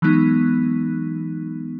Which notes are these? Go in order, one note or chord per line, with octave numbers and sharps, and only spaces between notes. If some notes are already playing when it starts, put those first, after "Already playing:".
E3 F#3 G#3 B3 D#4